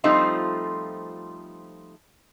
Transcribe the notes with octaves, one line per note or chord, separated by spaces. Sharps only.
F3 G3 A3 C4 D#4 F4